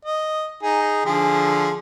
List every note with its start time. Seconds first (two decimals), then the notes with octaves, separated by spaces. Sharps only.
0.05 D#5
0.63 D#4 G#4
1.05 D3 F3 G#4